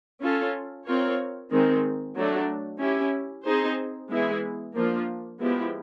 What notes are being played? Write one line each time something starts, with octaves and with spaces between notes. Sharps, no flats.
C#4 F4 A4
C4 F4 A#4 C#5
D#3 G#3 C4
F#3 A3 D4 F#4
C#4 E4 G4
C4 D#4 G#4 C5
E3 G#3 B3 E4 G#4
F3 A#3 D4 F4
F3 G#3 B3 E4 G4